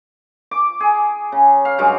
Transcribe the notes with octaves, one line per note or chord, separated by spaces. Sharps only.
D6
G#4
C#3
F5
G2 F#3 G#3 F5